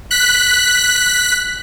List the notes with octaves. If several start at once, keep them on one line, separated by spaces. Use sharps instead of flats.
F#6 B6